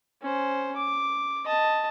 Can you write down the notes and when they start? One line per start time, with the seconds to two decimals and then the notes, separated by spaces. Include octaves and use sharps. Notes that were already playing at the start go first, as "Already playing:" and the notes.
0.22 C#4 C5
0.76 D6
1.45 D#5 A5